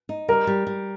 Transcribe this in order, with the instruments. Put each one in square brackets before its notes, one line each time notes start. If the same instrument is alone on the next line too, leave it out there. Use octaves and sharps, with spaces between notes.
[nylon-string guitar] D#4
[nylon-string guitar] G3 [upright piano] A#4
[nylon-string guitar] G3
G3